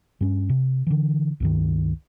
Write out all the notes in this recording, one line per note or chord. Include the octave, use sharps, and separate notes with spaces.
G2 C#4
C3
D3 E3
C#2 G2 D#3